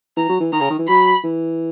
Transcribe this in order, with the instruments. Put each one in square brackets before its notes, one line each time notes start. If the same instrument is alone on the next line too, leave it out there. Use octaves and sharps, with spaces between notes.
[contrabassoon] E3 [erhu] A#5
[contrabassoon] F#3
E3
[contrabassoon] D#3 [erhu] A#5
[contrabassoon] C#3
D#3
E3
[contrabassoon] F#3 [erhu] B5
[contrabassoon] E3